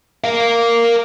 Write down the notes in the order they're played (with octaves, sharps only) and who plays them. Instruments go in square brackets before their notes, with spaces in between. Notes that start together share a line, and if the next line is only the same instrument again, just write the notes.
[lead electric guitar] A#4 F5